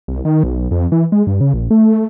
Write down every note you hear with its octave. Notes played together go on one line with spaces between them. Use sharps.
C2
D#3
B1
F2
E3
G#3
G2
C#3
A#1
A3
A3